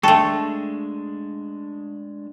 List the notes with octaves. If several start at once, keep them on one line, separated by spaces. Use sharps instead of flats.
G#3 A3 D4 A4 G5 A5 C#6